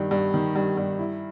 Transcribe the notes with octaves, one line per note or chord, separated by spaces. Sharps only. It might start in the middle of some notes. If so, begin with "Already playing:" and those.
Already playing: G2 D#3
G2
D#3
G2
G2
E4